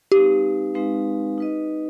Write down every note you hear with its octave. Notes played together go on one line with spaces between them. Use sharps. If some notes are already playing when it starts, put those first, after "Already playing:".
G#3 C4 D#4 G4 B4 F5
G#3 C4 D#4 B4 F5
D#4 B4 D#5